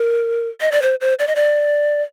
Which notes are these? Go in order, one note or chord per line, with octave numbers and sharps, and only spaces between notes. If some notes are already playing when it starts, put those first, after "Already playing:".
Already playing: A#4
D#5
D5
C5
C5
D5
D#5
D5